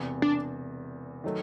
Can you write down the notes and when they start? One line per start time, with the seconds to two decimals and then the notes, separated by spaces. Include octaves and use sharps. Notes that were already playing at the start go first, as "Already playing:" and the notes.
Already playing: E1 E2 C3
0.22 D4
1.24 D#3 F#3 A3